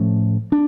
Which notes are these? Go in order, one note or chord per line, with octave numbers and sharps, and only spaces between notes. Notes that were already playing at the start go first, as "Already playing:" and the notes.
Already playing: A2 F3 A3 C#4
D4